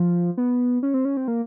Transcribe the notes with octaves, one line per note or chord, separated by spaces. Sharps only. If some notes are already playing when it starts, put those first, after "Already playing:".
Already playing: F3
B3
C#4
C4
C#4
C4
A#3